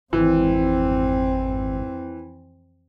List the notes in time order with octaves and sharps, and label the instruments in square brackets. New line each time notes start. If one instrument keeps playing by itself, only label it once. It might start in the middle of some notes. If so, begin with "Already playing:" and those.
[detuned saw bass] G#1 [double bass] F2 C4 [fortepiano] E3